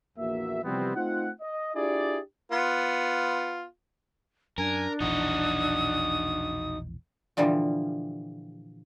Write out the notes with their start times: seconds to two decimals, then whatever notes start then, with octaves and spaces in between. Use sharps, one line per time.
0.18 A#1 E2 A#3 F#4 E5
0.64 C3 E3 F3 G3 B3 C4
0.95 A3 C4 D#4 F4 F#5
1.41 D#5
1.75 D4 E4 F4 G4 G#4 D5
2.52 B3 F4
4.58 F#2 D4 A#4 G#5
5.00 E1 A#1 E3 D#4 F#4 D#6
7.37 A#2 D3 E3 F3 G3